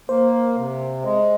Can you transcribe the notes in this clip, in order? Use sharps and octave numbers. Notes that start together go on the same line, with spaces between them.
A#3 C5
C3
G#3